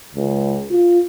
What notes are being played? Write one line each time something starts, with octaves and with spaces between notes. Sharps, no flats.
C#2
F4